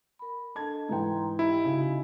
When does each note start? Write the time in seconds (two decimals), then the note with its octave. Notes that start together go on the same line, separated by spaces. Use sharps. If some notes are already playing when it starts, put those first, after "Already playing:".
0.19 A#4 B5
0.55 D4 A4 D#5 A5 G#6
0.89 G#2 E3 G5 A#5 C6
1.39 E4 G4 D#5
1.64 C#3 D#4 F#4 D#5